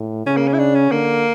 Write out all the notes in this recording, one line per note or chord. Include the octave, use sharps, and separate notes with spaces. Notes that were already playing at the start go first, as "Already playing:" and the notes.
Already playing: A2
C#3 C#4
A#3
C#4
E4
D4
C#4
D3 A#3